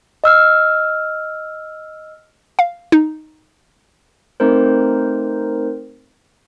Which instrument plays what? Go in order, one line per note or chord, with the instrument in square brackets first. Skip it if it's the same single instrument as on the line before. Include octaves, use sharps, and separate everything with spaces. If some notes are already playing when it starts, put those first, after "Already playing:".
[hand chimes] D#5 E6 F6
[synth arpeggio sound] F5
D#4
[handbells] A3 C4 D#4 A#4 C5